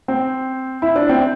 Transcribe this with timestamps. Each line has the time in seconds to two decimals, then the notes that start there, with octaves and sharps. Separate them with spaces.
0.08 C4
0.82 E4
0.96 D4
1.09 C4